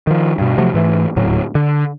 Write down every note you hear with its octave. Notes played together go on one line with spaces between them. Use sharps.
D#3 F3
G2 B2
C3 F3 F#3 A3
G#2 E3 A3
D#1 D2 A2 F#3
D3